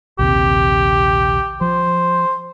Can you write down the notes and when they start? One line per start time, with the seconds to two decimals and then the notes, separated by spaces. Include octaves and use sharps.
0.19 A#1 D#2 C3 G4
1.61 F3 C5